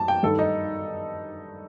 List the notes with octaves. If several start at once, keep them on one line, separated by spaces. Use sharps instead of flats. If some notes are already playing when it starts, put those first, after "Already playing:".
Already playing: F#2 A5
G5
G2 D#3 A4
D#4